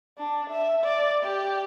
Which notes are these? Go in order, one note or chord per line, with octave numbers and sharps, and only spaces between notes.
D4
E5
D5
G4